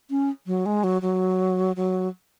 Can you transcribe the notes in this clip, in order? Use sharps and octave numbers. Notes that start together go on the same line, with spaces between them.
C#4
F#3
G#3
F#3
F#3
F#3